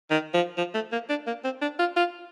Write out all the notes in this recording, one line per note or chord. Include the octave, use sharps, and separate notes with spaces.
D#3
F3
F3
A3
A#3
D4
A#3
C4
D4
F4
F4